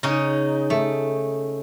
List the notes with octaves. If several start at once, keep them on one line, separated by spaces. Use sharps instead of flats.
C#3 C#4 D#4
A3